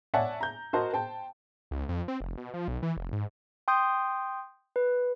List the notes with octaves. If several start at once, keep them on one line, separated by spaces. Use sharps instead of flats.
C#5 D5 E5 F#5 G#5 A5
A#5 G6
F#4 A#4 C5 D#5 A5
C5 G5 A5
C#2
F2
C4
F1
B2
F3
B1
E3
F1
G#2
G5 C6 D#6 G6
B4